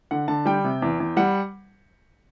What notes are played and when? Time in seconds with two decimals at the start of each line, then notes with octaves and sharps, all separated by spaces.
0.11 D3 F#5
0.28 D3 A5
0.45 G3 G5
0.64 C3
0.82 E2
1.00 E2
1.17 G3 F#5